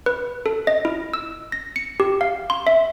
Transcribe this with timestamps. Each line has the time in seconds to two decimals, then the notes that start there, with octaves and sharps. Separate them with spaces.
0.06 B4
0.46 A4
0.67 D#5
0.85 E4
1.14 E6
1.52 A#6
1.76 C#7
2.00 G4
2.21 F5
2.50 C6
2.67 E5